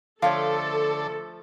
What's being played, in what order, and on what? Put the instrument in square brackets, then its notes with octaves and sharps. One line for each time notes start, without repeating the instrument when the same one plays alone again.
[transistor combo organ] D3 D5 A5 [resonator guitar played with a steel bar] F3 A3 [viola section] A4 [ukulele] C#5 F5